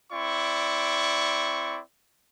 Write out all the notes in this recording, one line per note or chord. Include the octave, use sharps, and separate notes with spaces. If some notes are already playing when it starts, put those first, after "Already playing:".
C4 E4 D5 C#6